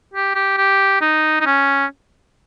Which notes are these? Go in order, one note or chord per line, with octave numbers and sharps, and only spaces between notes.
G4
G4
G4
D#4
D#4
C#4